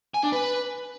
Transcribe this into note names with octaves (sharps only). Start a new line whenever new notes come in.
G#5
D4
B4